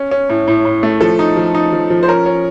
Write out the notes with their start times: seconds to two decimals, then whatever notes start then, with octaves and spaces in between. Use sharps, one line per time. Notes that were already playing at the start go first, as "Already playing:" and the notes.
Already playing: C#4
0.11 C#4
0.29 A2
0.48 A2
0.65 A2
0.83 A3
1.01 F3 A4
1.19 D#4
1.37 F3
1.54 D#4
1.72 F3
1.90 F3
2.03 C5
2.08 C#4 A#4
2.26 C#4